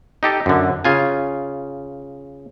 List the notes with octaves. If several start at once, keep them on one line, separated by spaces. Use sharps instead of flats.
D#4 G4 A4
F#2 D3
C#3 F4 G#5